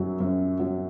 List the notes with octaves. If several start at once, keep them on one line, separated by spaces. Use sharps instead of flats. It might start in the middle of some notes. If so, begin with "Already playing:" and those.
Already playing: F#2 F#3
F#2
F#3